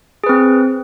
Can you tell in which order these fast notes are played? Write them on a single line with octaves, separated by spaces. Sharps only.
G#4 B4 C4